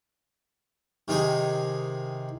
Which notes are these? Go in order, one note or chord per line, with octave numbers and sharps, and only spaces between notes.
C3 D#3 D#4 G#4